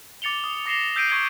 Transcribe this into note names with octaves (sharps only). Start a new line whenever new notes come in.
D6 A6 C#7 F7 G7
D#6
D6 A#6 C7 E7 G7
E6 G6 B6 C7 D7 D#7
C#6 D6 G#6 C7 D7 G7